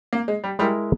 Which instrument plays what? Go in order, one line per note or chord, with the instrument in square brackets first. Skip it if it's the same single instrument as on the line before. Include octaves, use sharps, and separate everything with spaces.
[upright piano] A#3
G#3
G3
[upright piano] G3 [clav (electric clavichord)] G#3 E4 A#4